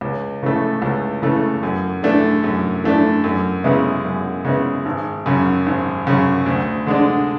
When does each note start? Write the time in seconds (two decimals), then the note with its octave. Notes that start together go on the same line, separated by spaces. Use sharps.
0.01 C#2
0.42 C#3 E3 A3
0.82 C#2
1.22 C#3 E3 A3
1.63 F#2
2.03 E3 A3 D4
2.44 F#2
2.84 E3 A3 D4
3.24 F#2
3.64 C#3 G#3 B3 E4
4.04 F#2
4.44 C#3 G#3 B3 E4
4.85 G#1
5.26 F#2 C#3
5.66 G#1
6.07 F#2 C#3
6.46 D2
6.86 D3 G#3 D4